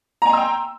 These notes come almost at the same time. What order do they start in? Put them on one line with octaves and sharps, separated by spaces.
A#5 G#5 C6 E6 G5